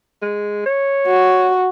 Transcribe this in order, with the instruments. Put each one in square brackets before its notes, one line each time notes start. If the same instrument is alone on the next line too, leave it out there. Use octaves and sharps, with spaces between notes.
[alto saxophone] G#3
C#5
[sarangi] F#4